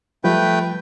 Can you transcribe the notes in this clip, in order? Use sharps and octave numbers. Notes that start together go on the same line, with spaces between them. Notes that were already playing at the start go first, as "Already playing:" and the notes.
F3 G3 A3 B4 G5